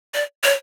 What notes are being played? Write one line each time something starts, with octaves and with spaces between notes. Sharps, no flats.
D5
C#5